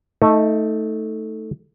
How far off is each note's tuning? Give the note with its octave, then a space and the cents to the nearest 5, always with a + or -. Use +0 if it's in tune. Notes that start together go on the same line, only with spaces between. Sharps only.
A3 +0 D#4 +20